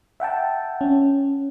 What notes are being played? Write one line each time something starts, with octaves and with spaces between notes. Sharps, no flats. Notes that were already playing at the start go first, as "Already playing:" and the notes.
E5 F#5 G5 A5
C#4